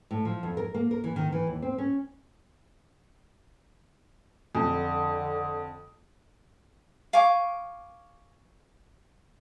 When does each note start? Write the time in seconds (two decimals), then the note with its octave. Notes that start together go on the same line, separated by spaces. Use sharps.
0.11 A2
0.25 F3
0.43 F2
0.57 A#4
0.74 A#3
0.91 A#4
1.04 E3
1.16 D#3
1.32 E3
1.47 D#2
1.62 C4
1.78 C#4
4.55 F2 D3
7.13 F5 G#5 C#6 D6